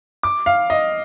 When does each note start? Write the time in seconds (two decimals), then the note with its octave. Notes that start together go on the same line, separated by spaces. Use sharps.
0.23 D6
0.46 F5
0.70 D#5